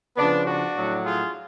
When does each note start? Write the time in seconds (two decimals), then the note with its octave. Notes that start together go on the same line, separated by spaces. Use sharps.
0.17 C#3 F3 B3 D4
0.47 D4 F#4
0.76 A2 F#3
1.05 F4 G#4